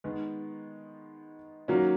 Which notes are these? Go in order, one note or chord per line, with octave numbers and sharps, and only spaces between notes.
D#3 G#3 B3
D#3 F#3 A#3 C#4 F#4